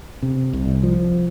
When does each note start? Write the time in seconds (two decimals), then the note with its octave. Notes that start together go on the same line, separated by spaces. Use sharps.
0.22 C3
0.53 C2
0.83 F3